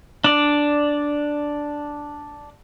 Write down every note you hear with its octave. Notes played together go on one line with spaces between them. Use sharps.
D4 D5